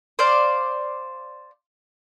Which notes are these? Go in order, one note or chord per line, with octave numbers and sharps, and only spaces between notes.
C5 D5 F5